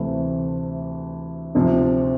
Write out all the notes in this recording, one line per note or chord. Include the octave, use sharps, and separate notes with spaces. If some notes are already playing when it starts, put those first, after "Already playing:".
Already playing: D2 C3 E3 A3
D2 C3 F3